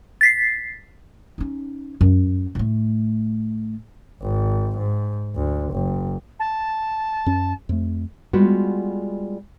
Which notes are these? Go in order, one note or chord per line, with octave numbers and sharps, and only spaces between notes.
A6 B6 C7
C#4 D#4
F#2
A2 A3
G#1
G#2
D2
F#1
A5
F#2 C#4
F2 A3
G3 G#3 B3 F4 F#4